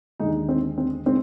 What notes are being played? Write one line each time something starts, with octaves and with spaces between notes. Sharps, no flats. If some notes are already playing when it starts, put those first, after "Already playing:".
D#2 D3 G#3 D#4
C4
C4
D3 G#3 C4